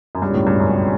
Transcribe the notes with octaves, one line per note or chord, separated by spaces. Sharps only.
F#2
C#2 G2 B2 G3 C#4
A2
G2
F#2